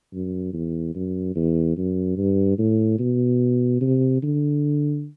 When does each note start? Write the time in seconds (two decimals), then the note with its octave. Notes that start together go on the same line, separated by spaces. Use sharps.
0.13 F#2
0.53 E2
0.95 F#2
1.36 E2
1.77 F#2
2.17 G2
2.58 A2
2.99 B2
3.81 C3
4.22 D3